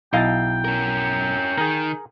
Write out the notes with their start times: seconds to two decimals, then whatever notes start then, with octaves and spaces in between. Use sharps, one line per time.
0.13 B1 E4 D#5 F5 G5 A5
0.65 C#4 A#4
1.58 D#3 G#4 A#4